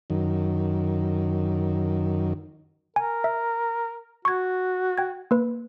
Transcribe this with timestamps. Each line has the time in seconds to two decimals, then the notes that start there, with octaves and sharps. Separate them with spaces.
0.10 F#2 D#3
2.96 A#4 G#5
3.24 E5
4.25 F#4 C#6 G#6
4.98 G5 G#6
5.31 A#3 B4